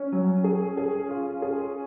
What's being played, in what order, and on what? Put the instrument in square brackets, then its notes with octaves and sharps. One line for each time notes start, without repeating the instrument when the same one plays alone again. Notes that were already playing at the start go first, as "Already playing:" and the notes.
Already playing: [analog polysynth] C#4
[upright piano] F#3
G#4
G#4
F4
G#4